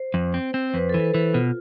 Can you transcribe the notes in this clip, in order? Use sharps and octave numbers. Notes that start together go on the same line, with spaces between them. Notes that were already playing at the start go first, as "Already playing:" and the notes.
Already playing: C5
F2
C4
C4
C5
F2 B4
A4
E3
A4
B4
E3 A4
B2 F4